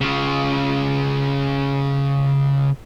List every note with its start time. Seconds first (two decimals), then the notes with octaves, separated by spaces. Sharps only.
0.01 C#3 F4